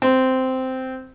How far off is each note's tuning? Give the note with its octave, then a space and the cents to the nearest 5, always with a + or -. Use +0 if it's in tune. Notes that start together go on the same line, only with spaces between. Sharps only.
C4 -10